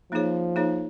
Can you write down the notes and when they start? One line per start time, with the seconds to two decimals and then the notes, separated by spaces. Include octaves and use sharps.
0.12 F3 A#3 D#4 G#4 C#5
0.56 A#3 D#4 G#4 C#5